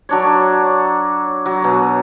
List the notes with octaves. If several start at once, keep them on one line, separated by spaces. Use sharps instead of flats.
F#3 D4 C#5
F#3
B2